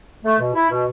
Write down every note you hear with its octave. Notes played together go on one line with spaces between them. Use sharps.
A3
B2
E4
B2